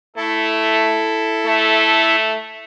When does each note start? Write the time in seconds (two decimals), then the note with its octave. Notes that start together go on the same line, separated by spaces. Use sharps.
0.16 A3 E4 A4
1.46 A3